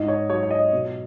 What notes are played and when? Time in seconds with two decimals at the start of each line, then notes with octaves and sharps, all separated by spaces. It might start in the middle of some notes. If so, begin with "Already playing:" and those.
Already playing: G#2 D#5
0.08 C#5
0.30 F#3 C#5
0.43 C#5
0.51 D#5
0.72 B2